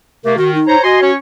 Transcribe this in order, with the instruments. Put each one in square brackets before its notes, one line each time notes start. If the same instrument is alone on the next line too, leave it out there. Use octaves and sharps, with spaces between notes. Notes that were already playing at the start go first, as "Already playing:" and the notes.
[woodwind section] C3 A3 A#3 [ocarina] A#4
[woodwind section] D#3 [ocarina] F#4
[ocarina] D#4
[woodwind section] C5 C#5 A#5
[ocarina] F#4 [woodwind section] D#5 G#5 C6
[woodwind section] C#4 C#5